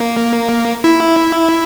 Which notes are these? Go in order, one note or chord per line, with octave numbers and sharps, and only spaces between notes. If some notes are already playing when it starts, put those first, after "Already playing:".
Already playing: A#3
E4